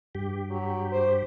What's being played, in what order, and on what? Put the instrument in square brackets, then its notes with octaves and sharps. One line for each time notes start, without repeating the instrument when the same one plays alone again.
[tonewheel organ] G2 G4
[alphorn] F#3
C5